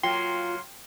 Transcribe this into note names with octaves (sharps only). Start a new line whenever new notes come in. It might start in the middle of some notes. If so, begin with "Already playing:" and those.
F#3 A#3 F4 G5 C6